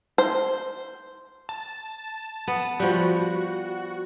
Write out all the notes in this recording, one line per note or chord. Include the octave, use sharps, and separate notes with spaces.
C5
A5
B3
F3 G3 F#4